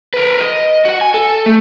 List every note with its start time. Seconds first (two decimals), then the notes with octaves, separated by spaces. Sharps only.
0.14 A#4 B4
0.41 D#5
0.85 F#4 F#5
1.01 G#5
1.14 A4
1.46 A3